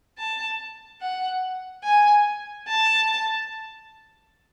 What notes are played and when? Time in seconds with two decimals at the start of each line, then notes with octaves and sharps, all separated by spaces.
0.18 A5
1.01 F#5
1.84 G#5
2.68 A5